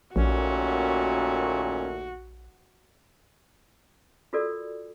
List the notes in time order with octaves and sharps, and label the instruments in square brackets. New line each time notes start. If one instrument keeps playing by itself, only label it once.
[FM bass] A#1 [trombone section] D#2 A#2 A3 [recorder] C#4 [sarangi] F#4
[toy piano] F4 F#4 A4 A#4 D5